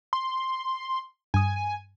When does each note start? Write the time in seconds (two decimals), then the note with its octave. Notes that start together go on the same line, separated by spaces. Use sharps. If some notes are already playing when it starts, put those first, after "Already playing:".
0.13 C6
1.34 G2 G#5 D#6